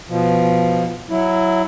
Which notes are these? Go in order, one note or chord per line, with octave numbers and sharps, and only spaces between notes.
B2 F3
F#3 E4